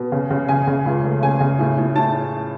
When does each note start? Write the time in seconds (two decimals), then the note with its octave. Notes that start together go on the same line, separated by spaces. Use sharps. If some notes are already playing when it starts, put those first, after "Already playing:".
Already playing: B2
0.12 C#3
0.30 C#3
0.49 C#3 G#5
0.67 C#3
0.86 C#2
1.04 A3
1.22 C#3 G#5
1.40 C#3
1.59 A2
1.78 A2
1.96 A2 A5